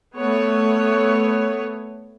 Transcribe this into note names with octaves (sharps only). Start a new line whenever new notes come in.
A3 B3 C#5